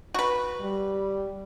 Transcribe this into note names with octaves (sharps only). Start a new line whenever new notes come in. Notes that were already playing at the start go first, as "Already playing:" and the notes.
F#4 B4
G3